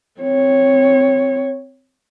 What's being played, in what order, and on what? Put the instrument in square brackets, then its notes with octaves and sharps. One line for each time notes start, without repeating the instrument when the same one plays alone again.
[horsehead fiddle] C4 C#5